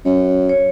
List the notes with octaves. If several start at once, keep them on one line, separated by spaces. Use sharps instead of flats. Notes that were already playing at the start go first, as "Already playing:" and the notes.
F#2 C#5
C#5